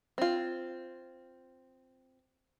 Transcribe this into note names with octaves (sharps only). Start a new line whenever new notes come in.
C4 F4